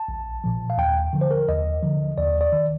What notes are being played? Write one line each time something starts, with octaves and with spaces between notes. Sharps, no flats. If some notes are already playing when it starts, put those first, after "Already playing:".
Already playing: A5
A#1
A#2 F3
F5
D#2 G5
D3 F3
C5
A#4
D#2 D#5
D3 F3
D#2 D5
D5
D#3